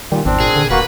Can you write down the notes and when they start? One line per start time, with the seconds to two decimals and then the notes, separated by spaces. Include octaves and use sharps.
0.12 A#2 D#3 G3
0.25 G#1 E2 C4 D4
0.40 A#2 G#4
0.56 D3
0.70 D#1 A#3 F#4 B4